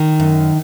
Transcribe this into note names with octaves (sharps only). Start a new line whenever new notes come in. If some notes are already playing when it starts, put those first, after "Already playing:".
Already playing: D#3
F#2